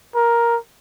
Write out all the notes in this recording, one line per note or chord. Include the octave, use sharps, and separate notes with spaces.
A#4